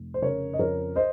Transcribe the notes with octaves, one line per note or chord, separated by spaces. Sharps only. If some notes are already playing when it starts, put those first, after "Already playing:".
Already playing: F1
C5
C#3 A#4 C#5
D#5
F2 A#4 C#5
C5 D#5